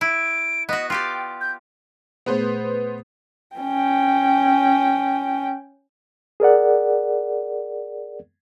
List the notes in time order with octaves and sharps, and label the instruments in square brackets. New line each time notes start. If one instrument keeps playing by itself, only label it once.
[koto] E4 [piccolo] D7
[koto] B3 F#4 [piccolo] D#5
[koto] F4 G4 D5 [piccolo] G5
[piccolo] G6
[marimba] A#2 A3 G#4 [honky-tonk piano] B3 B4 C5
[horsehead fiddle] C#4 G5
[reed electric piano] G#4 A#4 D5 F#5